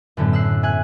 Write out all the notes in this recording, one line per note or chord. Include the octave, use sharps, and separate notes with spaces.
F#2 A2 D3 B3
E6 F#6 C7
E5 G#5 F#6